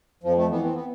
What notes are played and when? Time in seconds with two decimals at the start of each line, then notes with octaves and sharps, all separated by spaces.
0.23 F2 F3
0.37 A3
0.50 E3 B3
0.63 C4
0.74 B3